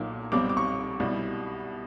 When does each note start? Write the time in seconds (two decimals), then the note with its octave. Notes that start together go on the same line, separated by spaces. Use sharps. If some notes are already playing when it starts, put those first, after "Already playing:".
Already playing: B1 A#2 F#3 A#3 D#4
0.32 B1 B2 G3 C4 D6
0.49 D6
0.57 C#6
1.00 C2 B2 G3